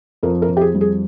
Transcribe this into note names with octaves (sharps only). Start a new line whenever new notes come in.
F2 A#4
A#4
F2
G4
G#4
G3
G#4